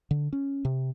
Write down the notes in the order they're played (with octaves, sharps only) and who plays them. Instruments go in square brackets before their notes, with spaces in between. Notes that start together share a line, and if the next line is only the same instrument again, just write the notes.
[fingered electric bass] D3
C#4
C3